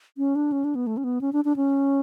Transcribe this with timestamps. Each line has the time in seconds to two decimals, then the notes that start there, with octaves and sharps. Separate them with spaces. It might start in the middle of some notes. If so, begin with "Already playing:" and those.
0.18 C#4
0.35 D4
0.52 C#4
0.64 D4
0.75 B3
0.87 A3
0.97 C#4
1.04 B3
1.21 C#4
1.33 D4
1.45 D4
1.56 C#4